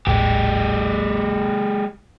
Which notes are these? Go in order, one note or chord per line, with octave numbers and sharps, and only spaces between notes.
D#1 A1 G#3 G4